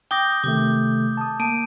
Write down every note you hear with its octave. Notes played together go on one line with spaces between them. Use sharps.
G5 D6 D#6 G6 A#6 G7
C3 D#3 A3 D6
A5 D#6
A#3 A5 D7 D#7